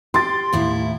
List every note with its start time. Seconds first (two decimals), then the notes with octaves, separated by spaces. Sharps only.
0.14 G4 C6 A6
0.53 D#2 A2 E4